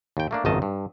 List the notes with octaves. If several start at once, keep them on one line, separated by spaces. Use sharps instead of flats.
D#2 G5
A3 A#3 D4
G#1 C#2 F#2 D#3 D#5 A5
G2